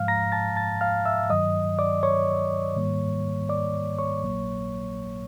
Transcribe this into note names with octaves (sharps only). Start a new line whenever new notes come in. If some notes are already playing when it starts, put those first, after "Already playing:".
Already playing: G#2 F3 G#3 F5 F6
A#5 A#6
A5 A6
A5 A6
F5 F6
E5 E6
G2 D#3 F#3 D#5 D#6
D5 D6
C#5 C#6
G#2 D#3 G3 A#3
D5 D6
C#5 C#6
A#1 A#2 F#3 A#3